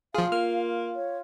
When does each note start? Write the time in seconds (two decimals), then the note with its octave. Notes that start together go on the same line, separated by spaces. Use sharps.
0.15 F3 F4 G#4 F5
0.32 A#3 F6
0.95 C#5